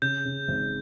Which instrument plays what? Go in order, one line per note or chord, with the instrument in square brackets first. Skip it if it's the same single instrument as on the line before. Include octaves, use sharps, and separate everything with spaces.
[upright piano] C#3 [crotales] G6
[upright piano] C#3
G#1